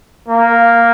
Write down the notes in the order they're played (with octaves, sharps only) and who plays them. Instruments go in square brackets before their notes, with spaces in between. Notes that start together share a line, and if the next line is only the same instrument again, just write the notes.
[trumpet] A#3